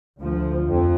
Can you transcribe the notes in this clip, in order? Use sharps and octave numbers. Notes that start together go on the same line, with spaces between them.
D2 F3
F2